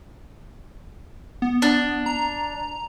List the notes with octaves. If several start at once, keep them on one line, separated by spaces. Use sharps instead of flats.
B3
D4
A#5